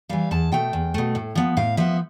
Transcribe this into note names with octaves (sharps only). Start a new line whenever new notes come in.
E3 G3 F5
E2 A5
B2 A3 G5
E2
B2 A3
A2
F3 B3
A2 F5
F3 B3 E5